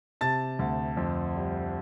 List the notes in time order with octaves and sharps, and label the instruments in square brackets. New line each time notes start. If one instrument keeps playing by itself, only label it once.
[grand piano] C3 A5 A6
D2
F2
G3